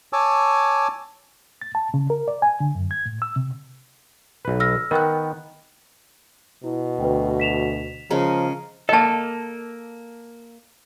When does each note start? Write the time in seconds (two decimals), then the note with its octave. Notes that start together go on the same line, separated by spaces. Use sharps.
0.13 C#5 G#5 A5 D6 E6
1.62 A6
1.75 A5
1.94 C#3
2.10 A#4
2.28 D5
2.42 G#5
2.60 D3
2.75 F#2
2.91 G#6
3.06 A2
3.22 E6
3.36 C3
4.45 B1 B4
4.60 E6 F6 A#6
4.91 D#3 B3 A#4 G5 F#6
6.64 B2 E4
7.00 D2 B4 G5
7.40 B6 E7 F7
8.11 C#3 F3 G#3 A#4 C#5 A#5
8.89 A#3 A4 D#5 A5